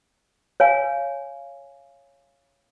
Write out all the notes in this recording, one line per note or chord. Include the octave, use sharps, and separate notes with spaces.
C#5 F5 G#5